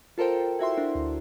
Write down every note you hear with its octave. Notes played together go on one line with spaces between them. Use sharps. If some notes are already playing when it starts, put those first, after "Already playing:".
F4 A4 A#4 C5 G5
E4 F#4 E5 C6
D4 A#4
D2